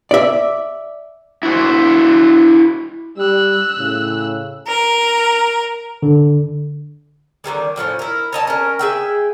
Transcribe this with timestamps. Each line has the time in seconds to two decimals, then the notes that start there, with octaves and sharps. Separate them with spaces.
0.11 D5 E5
1.43 E4 F#4 C5
3.18 G3 E6 F#6
3.78 A2 C#3
4.67 A#4
6.03 D3
7.44 D3 D#3 G3 G#3
7.76 A2 F3 C4 C#4
7.99 E4 A#4
8.33 C#5 D#5 A5
8.47 C#4 A#4
8.79 G#4 E5 G5